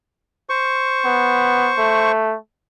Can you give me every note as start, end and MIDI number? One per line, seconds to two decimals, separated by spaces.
0.49 2.12 72
0.49 2.12 85
1.04 1.73 59
1.78 2.36 57